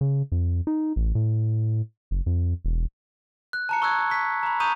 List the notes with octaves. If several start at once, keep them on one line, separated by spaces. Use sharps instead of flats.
C#3
F2
D#4
A1
A2
F#1
F2
E1
F#6
A5 A#5 C#7
C#6 E6 F#6 G#6
C#6 B6
A#5 B5
A#5 C#6 D#6 G6 D#7 F7